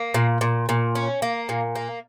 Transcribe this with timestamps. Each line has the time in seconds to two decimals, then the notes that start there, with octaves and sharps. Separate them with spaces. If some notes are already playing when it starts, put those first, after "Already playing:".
Already playing: A#3
0.14 A#2
0.41 A#2
0.69 A#2
0.95 C#4
1.22 A#3
1.49 A#2
1.75 A#3